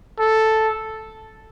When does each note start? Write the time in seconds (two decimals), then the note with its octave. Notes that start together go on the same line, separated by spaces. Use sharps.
0.19 A4